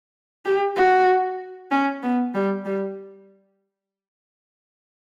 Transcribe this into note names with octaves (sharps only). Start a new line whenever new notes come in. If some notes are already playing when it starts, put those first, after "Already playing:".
G4
F#4
C#4
B3
G3
G3